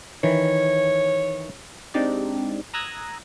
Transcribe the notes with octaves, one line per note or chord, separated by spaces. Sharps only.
D#3 E3 C#5
G#3 C4 D4 D#4 G4 D5
A#5 D#6 E6 F#6 G#6 A#6